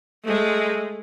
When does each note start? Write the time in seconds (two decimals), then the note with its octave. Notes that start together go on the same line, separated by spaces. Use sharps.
0.24 G#3 A3